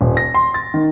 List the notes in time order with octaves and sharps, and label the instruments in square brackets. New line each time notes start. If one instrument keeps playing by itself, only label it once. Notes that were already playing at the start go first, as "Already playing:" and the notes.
[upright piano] D#1
A#6
C6
A6
D#3